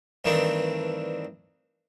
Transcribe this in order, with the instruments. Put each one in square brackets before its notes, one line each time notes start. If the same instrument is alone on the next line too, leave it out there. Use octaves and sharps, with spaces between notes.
[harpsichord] G2 D#3 E3 A3 C4 D4